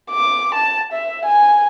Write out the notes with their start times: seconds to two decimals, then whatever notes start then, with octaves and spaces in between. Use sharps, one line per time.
0.11 D6
0.55 A5
0.93 E5
1.26 G#5